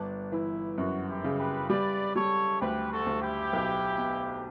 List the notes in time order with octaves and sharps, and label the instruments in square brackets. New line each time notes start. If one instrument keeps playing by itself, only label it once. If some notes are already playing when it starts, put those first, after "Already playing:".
Already playing: [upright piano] G1 [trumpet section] D4
[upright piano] E3 [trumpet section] E4
[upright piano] F#2 [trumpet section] F#4
[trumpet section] E4 G4
[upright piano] C#3
[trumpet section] G4 B4
[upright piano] G3 [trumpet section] B4 D5
[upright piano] G3 [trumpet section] A4 C#5
[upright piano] D2 [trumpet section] G4 B4
[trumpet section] F#4 A4
[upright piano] D2
[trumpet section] E4 G4
[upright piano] B1
B2